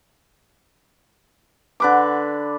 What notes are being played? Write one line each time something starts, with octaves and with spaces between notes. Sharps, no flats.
D3 B4 D6